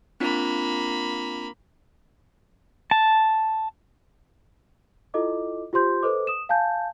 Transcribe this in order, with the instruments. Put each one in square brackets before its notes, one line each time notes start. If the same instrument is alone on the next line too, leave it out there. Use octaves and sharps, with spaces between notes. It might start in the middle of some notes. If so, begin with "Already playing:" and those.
[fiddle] A#3 B5 [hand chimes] C4 D4 F4
[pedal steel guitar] A5
[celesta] E4 F4 A4 D#5 D6
F4 G4 C5 C6 G6
A4 B4 C5 D#5 D6
D#6 E7
F5 G#5 A5 G6